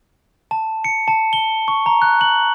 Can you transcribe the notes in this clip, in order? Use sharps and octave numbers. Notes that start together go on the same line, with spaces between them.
A5
C#7
A5
G7
C#6
A#5
F#6
F#7